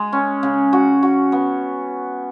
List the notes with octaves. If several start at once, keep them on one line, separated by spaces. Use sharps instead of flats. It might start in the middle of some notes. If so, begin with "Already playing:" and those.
Already playing: G#3
C#4
C#3
F#4
F#4
B3